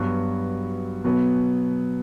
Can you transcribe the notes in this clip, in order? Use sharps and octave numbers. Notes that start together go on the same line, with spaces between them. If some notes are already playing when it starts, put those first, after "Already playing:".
Already playing: G2 F#3 B3 F#4
B2 F#3 B3